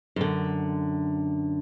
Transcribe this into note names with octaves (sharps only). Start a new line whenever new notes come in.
F#2 D3